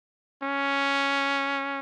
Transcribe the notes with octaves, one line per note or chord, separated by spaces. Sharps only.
C#4